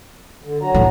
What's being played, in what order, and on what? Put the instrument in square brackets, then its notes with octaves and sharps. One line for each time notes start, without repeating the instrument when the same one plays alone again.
[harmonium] D3
F#3 F#4 A#5
[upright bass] A2 A3